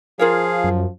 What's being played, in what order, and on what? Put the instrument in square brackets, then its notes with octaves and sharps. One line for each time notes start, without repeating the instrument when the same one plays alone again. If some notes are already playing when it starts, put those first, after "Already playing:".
[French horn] F3 [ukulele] F4 A#4 C#5 [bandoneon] G#4 F5
[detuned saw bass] F#2